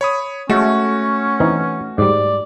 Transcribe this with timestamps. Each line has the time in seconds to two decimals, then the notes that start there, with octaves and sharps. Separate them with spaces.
0.01 C#5 B5 D#6
0.50 G#3 A3 C#4 F#4
1.40 E3 C4 D#4
1.98 G#2 G3 D5